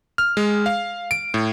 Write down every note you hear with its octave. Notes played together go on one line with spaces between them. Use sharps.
F6
G#3
F5
D7
A2